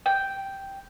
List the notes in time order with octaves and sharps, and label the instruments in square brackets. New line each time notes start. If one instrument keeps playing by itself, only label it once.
[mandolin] G5